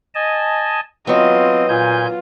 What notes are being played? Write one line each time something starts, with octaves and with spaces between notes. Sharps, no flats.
D#5 G#5 A5
F#3 B3 C4 F4 D#5
A#2 F4 G#5 G6